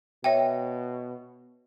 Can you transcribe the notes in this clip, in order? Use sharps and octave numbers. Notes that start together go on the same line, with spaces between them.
B2 C#5 E5 G5